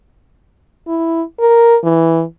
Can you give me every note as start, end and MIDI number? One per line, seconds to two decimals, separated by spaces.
0.88 1.22 64
1.40 1.76 70
1.84 2.23 52